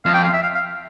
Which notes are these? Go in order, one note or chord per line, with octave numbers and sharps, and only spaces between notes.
F2 F5
G5
F5
E5
F5
F5